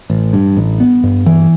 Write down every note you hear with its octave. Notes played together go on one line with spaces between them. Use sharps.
A1
G2
A1
B3
G2
E3